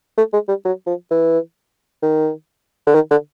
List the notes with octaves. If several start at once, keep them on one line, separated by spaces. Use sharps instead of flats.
A3
G#3
G3
F#3
F3
E3
D#3
D3
D#3
D3